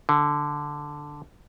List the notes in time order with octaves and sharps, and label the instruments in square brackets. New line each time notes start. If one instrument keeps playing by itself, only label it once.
[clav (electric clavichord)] D3